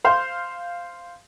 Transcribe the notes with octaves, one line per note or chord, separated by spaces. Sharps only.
C5 F5 C6 G6